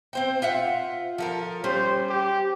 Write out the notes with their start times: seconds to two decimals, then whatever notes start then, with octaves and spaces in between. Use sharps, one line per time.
0.13 C4 C5 G5
0.42 F4 E5 F#5
1.18 F3 A4 A#4
1.64 G3 C#4 C5
2.09 G4